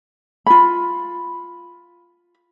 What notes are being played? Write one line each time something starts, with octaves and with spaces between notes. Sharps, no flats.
F4 B5